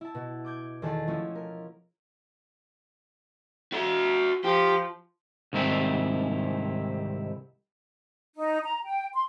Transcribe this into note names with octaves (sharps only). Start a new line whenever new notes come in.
E4 A5
B2
D6 G6 G#6
E2 D#3 G#4 A4 A5
F3 A3 C#4 E4
A#4
F#4 E5
F3 G4
C2 G#2 D#3 C4 E4
D#4
A#5
G5
C6